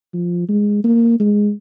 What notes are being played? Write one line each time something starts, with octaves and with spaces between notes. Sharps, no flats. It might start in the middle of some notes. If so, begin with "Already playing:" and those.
F3
G#3
A#3
G#3